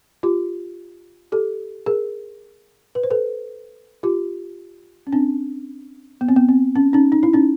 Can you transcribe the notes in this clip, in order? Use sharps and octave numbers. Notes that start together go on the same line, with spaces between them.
F4 G4
G4 A4
G#4 A#4
B4
C5
A4 B4
F4 G4
C#4
C4 D4
B3
C4
B3
C4
C#4
C#4 D#4
D#4
E4
C#4 D#4